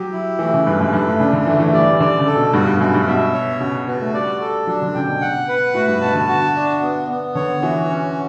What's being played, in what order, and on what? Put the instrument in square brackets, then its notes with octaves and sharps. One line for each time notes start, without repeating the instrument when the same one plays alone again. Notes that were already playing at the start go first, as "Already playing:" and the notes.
Already playing: [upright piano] F#3 [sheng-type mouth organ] G4
[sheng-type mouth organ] E4
[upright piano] E3 [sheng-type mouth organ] A3
[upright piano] C#3
[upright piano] G2 [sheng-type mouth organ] B4
[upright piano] F#2
[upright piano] G2 [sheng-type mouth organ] A4
[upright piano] A2
[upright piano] C#3 [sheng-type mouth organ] D4
[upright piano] D3
[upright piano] E3 [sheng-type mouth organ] A3
[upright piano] E3
[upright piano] G3 [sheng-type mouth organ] D5
[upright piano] D3 [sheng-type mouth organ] D5
[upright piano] C#3
[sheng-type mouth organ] A4
[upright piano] B2
[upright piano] G2 [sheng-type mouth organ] F#4
[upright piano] G2
[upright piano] F#2 [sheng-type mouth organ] F#4
[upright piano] G2
[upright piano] B2 [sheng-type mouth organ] E5
[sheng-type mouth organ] C#5
[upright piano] C#3 [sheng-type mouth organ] F#4
[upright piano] B3 [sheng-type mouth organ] F#4
[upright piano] A3
[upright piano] G3 [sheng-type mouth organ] D5
[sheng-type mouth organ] A4
[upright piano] F#3 [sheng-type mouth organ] D4
[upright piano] D3
[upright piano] C#3 [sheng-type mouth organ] G5
[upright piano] B2
[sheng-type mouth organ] F#5
B4
[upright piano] A2 [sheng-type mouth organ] F#4
[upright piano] G2
[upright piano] B2 [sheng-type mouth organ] A5
[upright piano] D3
[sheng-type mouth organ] F#4
D4
B3
B3
[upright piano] D3 [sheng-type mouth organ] C#5
[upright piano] E3 [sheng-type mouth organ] F#4
[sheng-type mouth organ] C#4